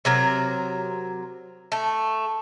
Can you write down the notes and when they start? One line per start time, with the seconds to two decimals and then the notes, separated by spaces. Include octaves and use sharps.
0.05 C3 F#3 A#4
1.72 A3